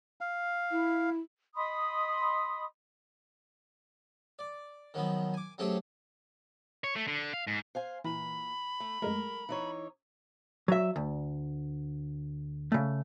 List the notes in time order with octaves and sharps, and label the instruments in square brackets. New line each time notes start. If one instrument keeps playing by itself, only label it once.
[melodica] F5
[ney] E4
[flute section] D#5 B5 C6 D#6
[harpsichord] D5
D#3 F3 F#3 B3
G#5 D6
F#3 A3 C4 C#4 G4 G#4
[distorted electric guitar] C#5
A3
D3
F5
G#2
[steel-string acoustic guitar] C5 F5 G#5
[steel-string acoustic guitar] A#2 [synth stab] E3 [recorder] B5
[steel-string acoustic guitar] A3
[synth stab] F#2 G#3 A3 [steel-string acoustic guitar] A#4
[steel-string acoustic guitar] E3 D#4 C#5
[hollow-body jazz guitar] F#3 E5
D2
C#3 A3